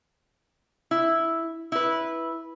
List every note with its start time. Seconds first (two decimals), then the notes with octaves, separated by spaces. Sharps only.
0.91 E4
1.72 E4 B4